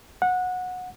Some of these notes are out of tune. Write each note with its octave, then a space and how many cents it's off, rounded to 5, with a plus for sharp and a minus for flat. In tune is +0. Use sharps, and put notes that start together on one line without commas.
F#5 -20